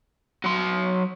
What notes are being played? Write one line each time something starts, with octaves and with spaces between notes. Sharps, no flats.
F#3 C6